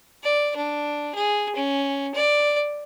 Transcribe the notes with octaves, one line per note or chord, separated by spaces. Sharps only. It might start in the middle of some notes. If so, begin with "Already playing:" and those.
D5
D4
G#4
C#4
D5